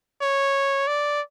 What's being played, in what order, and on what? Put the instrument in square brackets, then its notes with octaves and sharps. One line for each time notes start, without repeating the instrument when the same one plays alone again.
[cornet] C#5
D5